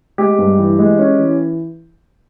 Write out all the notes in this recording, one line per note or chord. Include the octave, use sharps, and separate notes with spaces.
G#3 G4
G2
E3
G#3
C#4
E3